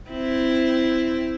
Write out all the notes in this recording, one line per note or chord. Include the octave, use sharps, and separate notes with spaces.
C4 E4